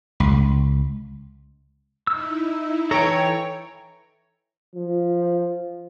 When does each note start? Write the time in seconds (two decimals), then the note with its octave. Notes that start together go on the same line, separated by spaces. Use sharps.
0.20 C#2
2.07 D#4 E4 E6
2.91 E3 A4 C#5 G5 A#5
4.75 F3